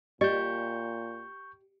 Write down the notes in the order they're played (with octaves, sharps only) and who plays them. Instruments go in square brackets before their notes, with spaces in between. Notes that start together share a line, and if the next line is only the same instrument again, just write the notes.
[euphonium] A#2 [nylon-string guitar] G4 [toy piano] D5 D#5 [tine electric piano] C#6 G6